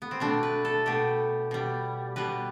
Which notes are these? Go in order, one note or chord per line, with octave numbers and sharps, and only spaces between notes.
B3
C4
B2 A3 D4
B4
A4
B2 A3 G4
B2 G3
B2 G3 B4